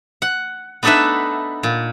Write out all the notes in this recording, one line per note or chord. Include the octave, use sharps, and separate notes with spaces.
F#5
B3 D4 D#4 A4 B4 E5
A#2